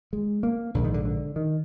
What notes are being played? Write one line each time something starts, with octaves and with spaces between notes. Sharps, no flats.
G#3
A#3
A#1 G#2 D3 D#3
D3
D3
D#3